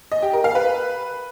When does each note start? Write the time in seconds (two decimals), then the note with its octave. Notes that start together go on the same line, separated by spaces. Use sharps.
0.12 D#5
0.22 G4
0.33 A#4
0.44 F5
0.55 B4